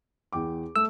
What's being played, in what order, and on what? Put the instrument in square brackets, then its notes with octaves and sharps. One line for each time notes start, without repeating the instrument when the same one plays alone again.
[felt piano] E2 G5 D6
[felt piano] A3 [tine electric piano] E6